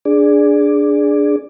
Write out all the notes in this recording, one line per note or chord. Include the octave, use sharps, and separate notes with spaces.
D4 G#4 D5